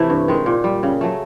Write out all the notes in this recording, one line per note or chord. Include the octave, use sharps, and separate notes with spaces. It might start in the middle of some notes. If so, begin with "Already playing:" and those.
Already playing: C3 E3 A3 E4
G2
D#3 G#3
A#2
G3
C#3
F#3 A3